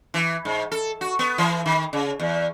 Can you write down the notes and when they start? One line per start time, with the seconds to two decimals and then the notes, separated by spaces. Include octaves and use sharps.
0.14 E3
0.45 G#2
0.72 A4
1.01 F#4
1.19 B3
1.38 E3
1.66 D#3
1.93 C#3
2.20 E2